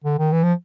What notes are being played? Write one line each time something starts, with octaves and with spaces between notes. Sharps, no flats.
D3
D#3
E3
F3